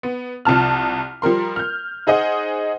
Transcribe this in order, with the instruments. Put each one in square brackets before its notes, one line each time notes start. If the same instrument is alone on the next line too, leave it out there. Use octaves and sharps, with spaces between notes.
[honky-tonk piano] B3
C2 F3 A5 F6
F3 G3 A#4 C6
F6 G6
D#4 G#4 C5 D#5 F#5